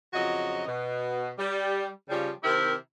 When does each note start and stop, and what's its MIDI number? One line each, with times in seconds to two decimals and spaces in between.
0.13 0.64 41
0.13 0.64 49
0.13 0.64 53
0.13 0.64 54
0.13 0.64 66
0.13 0.64 75
0.66 1.30 47
1.38 1.88 55
2.09 2.30 49
2.09 2.30 53
2.09 2.30 55
2.43 2.74 48
2.43 2.74 51
2.43 2.74 60
2.43 2.74 64
2.43 2.74 67
2.43 2.74 70